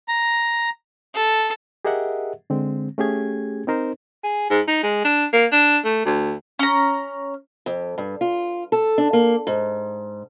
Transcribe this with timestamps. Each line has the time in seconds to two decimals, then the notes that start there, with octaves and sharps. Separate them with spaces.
0.08 A#5
1.15 A4
1.85 G4 G#4 A#4 D#5 E5 F#5
2.50 D3 G#3 C4
2.98 A3 C#4 G4 G#4 G#6
3.67 C4 D#4 A#4 C5
4.24 G#4
4.50 G#2
4.68 D#4
4.83 G#3
5.05 D4
5.33 A#3
5.52 D4
5.85 A3
6.06 D2
6.59 C#4 A#5
7.66 F2
7.98 G2
8.21 F4
8.72 A4
8.98 D4
9.13 A#3
9.47 G#2